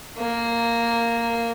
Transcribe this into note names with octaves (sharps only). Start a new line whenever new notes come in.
A#3